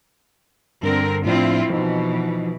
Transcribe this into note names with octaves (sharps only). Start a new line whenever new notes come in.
G2 D3 C4 A#4
A2 F3 C4 D4 E4 F4
B2 E3 F3 D#4